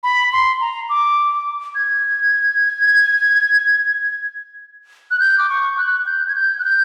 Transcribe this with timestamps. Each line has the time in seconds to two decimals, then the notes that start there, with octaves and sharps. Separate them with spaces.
0.03 B5
0.32 C6
0.61 A#5
0.89 D6
1.75 G#6
5.11 F#6
5.20 G6
5.38 D6
5.49 C#6
5.78 F#6
6.06 G6
6.28 G#6
6.35 G6
6.59 F#6
6.65 G6